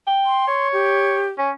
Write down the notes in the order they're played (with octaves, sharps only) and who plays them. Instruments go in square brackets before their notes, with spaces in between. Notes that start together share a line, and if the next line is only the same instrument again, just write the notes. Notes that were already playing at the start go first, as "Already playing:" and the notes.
[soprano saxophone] G5
[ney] C6
[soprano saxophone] C#5
[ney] G4
[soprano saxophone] C#4